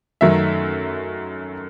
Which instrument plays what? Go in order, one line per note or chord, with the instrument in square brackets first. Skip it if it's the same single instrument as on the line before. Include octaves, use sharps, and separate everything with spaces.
[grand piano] F#2 D#3 F#3 A3 E5